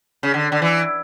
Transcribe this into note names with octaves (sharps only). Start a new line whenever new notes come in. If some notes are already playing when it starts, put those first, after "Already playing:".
C#3
D3
D3
E3